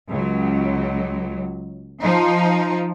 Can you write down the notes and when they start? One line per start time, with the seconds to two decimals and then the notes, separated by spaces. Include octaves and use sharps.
0.10 C#2 F#3
2.02 F3 D#4